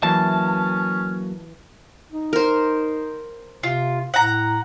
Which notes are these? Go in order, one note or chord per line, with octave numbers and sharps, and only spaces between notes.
E3 F#3 A#3 C#4 A5
D#4
A#4 C5
C3 F4
A2 F#5 A#5